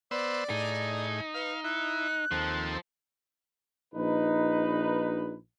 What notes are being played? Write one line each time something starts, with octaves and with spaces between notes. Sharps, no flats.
B3 C5 D5 E6
A2 D#4 G#4
B4 F5
E4 F#6
D#2 F3 C4 A4
A#1 D#4 B4